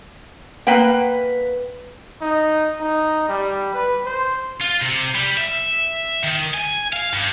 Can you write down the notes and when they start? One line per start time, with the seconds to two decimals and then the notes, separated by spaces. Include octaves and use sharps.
0.67 A#3 B4 F#5 G5
2.21 D#4
2.80 D#4
3.29 G3
3.74 B4
4.05 C5
4.61 F4
4.81 C3
5.15 G3
5.37 E5
6.24 D#3
6.54 G#5
6.93 F5
7.13 G2